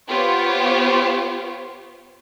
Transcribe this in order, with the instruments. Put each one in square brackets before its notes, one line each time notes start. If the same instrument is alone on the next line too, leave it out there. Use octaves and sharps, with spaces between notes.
[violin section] B3 F4 G4 C5 C#5